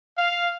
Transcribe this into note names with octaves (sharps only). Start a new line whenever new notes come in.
F5